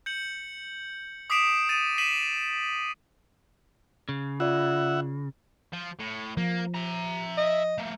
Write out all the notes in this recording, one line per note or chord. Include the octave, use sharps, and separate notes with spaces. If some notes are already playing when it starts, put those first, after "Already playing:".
G6 C#7 F#7
D6 D#6 B6 C7 D7 E7
D#6 A6 D#7
B6 C7 D#7 E7 F#7
C#3
F4 D5 E5 F#5
F3
A2
F3 A#3
E5 A#5
D#5
A3 A#3